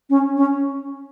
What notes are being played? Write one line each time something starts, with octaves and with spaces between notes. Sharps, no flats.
C#4
C#4